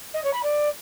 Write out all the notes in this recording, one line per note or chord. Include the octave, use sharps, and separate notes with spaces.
D#5
C#5
B5
D5